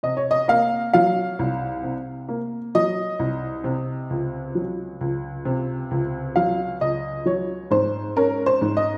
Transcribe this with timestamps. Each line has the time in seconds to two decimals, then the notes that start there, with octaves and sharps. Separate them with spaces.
0.03 C3 D#5
0.17 C#5
0.31 D#5
0.48 A#3 F5
0.93 F#3 F5
1.39 C2
1.83 C3
2.29 A#3
2.75 F#3 D#5
3.19 C2
3.64 C3
4.10 C#2
4.55 F#3
5.01 C#2
5.45 C3
5.91 C#2
6.36 F#3 F5
6.81 C#2 D#5
7.26 F#3 C#5
7.71 G#2 C5
8.16 C#4 A#4
8.46 C5
8.61 G#2
8.77 D#5